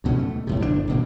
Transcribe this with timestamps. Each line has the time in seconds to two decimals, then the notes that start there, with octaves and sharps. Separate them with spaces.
0.04 D2 B2 A3 C#4
0.19 A3
0.47 F2 A2 C3
0.60 G1 G2 C3 D4
0.87 D#1 B2 A#3